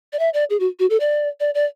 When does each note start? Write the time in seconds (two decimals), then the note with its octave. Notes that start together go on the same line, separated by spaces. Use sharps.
0.13 D5
0.19 E5
0.34 D5
0.50 G#4
0.60 F#4
0.79 F#4
0.90 A4
1.00 D5
1.40 D5
1.55 D5